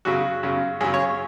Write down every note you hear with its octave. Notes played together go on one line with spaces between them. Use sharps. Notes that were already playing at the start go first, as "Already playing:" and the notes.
F#2 C#3 F#4
F#2 C#3
F#2 C#3 G#4
C#5